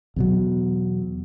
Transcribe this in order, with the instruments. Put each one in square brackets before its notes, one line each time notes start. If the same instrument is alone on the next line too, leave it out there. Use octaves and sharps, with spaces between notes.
[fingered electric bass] E2 B2 F#3